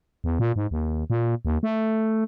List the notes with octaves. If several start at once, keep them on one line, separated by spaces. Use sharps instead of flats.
E2
A#2
G#2
D#2
A#2
D#2
A3